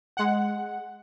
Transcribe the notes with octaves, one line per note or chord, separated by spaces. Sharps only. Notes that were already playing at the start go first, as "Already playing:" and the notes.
G#3 F#5